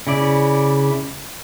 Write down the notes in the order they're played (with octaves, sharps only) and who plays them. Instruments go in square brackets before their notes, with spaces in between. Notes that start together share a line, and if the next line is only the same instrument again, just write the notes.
[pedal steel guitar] C#3 E4 D5